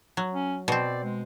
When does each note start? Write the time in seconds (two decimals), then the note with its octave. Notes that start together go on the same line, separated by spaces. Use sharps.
0.17 F#3
0.34 C#4
0.68 B2 C4 D5
1.04 G#3